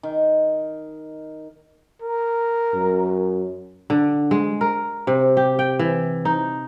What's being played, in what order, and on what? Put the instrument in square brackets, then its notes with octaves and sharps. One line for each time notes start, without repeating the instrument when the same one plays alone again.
[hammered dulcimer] D#3
[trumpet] A#4
[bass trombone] F#2
[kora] D3
G#3
A#4
C3
G4
G5
E3
D#4